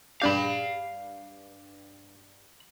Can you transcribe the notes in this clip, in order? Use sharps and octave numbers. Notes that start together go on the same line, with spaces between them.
G2 D4 G4 F5 B5